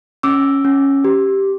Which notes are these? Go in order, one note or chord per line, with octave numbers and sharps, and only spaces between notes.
C#4 D6 E6
C#4
G4